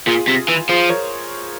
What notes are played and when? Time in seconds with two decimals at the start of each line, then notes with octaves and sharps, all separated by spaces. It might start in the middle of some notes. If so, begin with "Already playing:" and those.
0.07 A#2 F4 G#4
0.28 C3
0.48 E3
0.69 F3 G#4 C5
0.90 A#4 C#5